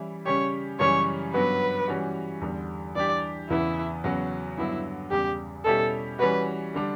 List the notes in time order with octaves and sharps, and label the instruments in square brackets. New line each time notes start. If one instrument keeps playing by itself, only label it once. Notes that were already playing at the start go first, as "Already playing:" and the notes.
Already playing: [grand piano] E3 G3 C#4 E4
[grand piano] C#3 G3 C#4 G4 [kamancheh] C#5
[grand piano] F#2 C#3 E3 G3 C#4 [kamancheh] C#5
[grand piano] G2 F#3 B3 F#4 [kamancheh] B4
[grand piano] E3 G3 C#4 F#4
E2 D3 G3
[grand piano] E3 G3 D4 G4 [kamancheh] D5
[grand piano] E2 C#3 E3 B3 [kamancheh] E4
[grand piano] E2 C#3 F#3 B3 F#4
[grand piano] G2 D3 F#3 B3 [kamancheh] E4
[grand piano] E2 C#3 G3 [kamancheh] G4
[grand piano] B2 G3 C#4 E4 G4 [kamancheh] A4
[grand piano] E3 G3 C#4 F#4 [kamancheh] B4
[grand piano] D3 G3 D4